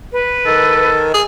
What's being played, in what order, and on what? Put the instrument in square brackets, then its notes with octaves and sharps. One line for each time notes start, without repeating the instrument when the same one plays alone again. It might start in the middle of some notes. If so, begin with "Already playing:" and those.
[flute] B4
[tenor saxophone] D#3 [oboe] A4
[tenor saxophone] G#4